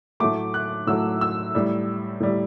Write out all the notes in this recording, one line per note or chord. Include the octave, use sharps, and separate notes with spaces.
A2 F#3 A3 D6
F#6
A2 F#3 A3 E6
E6
A2 G3
A2 G3